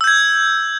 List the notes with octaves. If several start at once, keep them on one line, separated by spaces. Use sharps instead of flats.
E6 G6 G#6